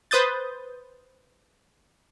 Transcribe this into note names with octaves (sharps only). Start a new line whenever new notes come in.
B4 C5 D#6 G6 A6